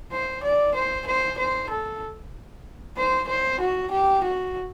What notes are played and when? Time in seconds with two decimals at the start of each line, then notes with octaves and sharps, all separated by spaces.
0.12 C5
0.43 D5
0.74 C5
1.06 C5
1.38 C5
1.69 A4
2.97 C5
3.28 C5
3.60 F#4
3.91 G4
4.23 F#4